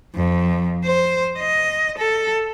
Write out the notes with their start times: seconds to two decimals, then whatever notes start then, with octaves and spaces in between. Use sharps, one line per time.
0.15 F2
0.84 C5
1.39 D#5
1.98 A4